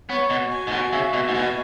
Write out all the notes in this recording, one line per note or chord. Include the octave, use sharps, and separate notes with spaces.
B3 C#5
B2 F#4
G#5
G#2
B2 F#4
C#3 E5
B2 F#4
G#2
B2 G#5